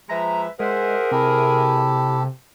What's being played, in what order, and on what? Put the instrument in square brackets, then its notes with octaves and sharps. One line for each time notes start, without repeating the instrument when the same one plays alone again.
[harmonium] F3 [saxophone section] G#3 B4 E5 [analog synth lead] A#5
[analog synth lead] G#3 [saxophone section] G#4 A#4 [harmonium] C5 E5 F#5
[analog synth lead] C3 [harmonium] E4 [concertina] G4 A4